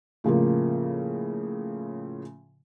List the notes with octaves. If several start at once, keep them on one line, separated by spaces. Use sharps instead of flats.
A2 C#3 F3 A#3